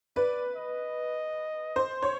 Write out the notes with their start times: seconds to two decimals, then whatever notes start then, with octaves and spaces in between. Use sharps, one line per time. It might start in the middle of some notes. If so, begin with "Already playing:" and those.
0.16 B4 D5
0.56 D#5
1.76 C5
2.02 C#5